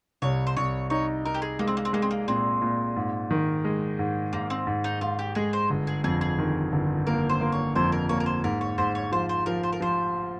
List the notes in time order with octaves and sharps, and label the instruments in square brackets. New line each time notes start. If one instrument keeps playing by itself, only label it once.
[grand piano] C2 [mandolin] C#5
[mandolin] C5
[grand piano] C2 [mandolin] C#5
[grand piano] D#4 [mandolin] C#5
[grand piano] D#4 [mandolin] A#4
[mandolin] G4
G#4
[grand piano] G#3 [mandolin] A#3
[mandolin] C4
A#3
C4
[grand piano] G#3 [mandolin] A#3
[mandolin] C4
A#3
[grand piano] A#2 [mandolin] C4
[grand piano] A#2
G#2
D#3
G#3
G#2
[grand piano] G#2 [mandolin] A#3
[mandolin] C4
[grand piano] G#2
[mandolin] D#4
[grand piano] G#2 [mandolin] F4
[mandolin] G4
[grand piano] G#3 [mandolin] G#4
[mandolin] C5
[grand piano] G1
[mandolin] G#4
[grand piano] F2 [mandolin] G#4
[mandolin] G#4
[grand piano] D#3
G1
[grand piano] A#3 [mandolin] A#4
[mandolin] C5
[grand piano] A#3
[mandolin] C#5
[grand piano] F2 [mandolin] C5
[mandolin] A#4
[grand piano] A#3 [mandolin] C#5
[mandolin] A#4
C5
[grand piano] G#2 [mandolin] A#4
[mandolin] C#5
[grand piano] G#2 [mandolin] C5
[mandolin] C#5
[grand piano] F3 [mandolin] C5
[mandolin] C5
[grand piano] F3 [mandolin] A#4
[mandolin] C5
A#4
[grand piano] F3 [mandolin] C5